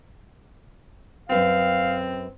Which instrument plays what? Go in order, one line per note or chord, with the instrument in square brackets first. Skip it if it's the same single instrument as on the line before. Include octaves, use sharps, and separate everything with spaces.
[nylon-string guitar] F#2 B4 G5 [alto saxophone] C4 [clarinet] F5